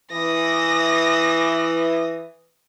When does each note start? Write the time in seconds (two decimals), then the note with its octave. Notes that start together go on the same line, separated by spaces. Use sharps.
0.11 E3 D#6 A#6